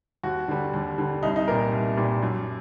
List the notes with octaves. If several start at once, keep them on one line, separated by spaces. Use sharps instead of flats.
D#2 F#4
D3 G3
D#2
D3 G3
C2 D#4
D#4
A#2 G3 A#4
C2
A#2 G3
F#2